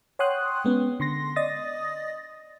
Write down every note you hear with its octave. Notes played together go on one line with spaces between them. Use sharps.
C#5 F#5 G5 C6 D#6 F#6
G#3 B3 C#4
D3 C6 A#6
D5 D#5 D#6 A6 A#6